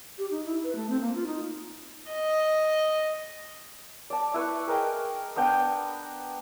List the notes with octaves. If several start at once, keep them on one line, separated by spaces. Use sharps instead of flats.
G4
D#4
E4
B4
A3
C4
A#3
F4
D#4
D#5
D5 A5
E4 B4 C#6
G#4 A#4 D#5 G5
B3 D4 G5 A#5